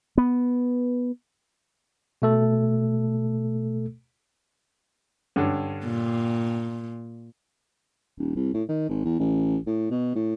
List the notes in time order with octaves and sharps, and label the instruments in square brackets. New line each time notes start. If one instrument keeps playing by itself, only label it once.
[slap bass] B3
[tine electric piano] B2 A3 A4
[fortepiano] G2 D3 C#4
[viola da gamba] A#2
[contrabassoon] D#1
C2
A2
D#3
G#1
E2
A1
A2
B2
A2